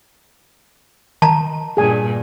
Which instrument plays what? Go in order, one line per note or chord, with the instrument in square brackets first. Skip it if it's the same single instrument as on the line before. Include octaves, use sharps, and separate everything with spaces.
[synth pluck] D#3 [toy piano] A5 A#5
[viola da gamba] G2 A#2 [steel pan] G#4 G#5